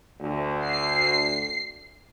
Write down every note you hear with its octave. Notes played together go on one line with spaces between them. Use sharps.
D2
C7